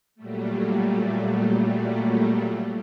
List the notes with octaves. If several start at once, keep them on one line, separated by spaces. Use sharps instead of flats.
A#2 F#3 G3 A3